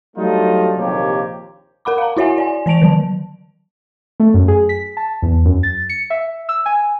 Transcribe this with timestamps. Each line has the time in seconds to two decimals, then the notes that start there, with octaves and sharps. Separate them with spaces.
0.16 F#3 G3 A3 D4 D#4 F4
0.77 A#1 D#2 C3 A#3 G4 C#5
1.85 A#4 F#5 B5 D6
1.98 F5 A#5
2.17 E4 F#4 C#5 E5 F#5 G#5
2.38 D5 G#5
2.66 E3 D5 A5 D7 F7
2.82 D3 D#3 F#3 A5
4.20 A3
4.34 F#2
4.48 G#4
4.69 B6
4.97 A5
5.22 E2
5.45 F#2
5.63 A6
5.89 C#7
6.10 E5
6.49 E6
6.66 G#5